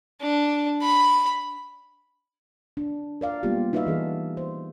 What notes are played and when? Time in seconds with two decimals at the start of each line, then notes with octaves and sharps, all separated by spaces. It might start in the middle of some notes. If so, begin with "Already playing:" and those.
0.21 D4
0.82 B5
2.77 D4
3.21 A#4 D5 F5
3.43 G3 G#3 A#3 B3 F4 G4
3.73 D#4 F#4 B4 D5 E5 F5
3.87 E3 G#4 A4
4.37 C5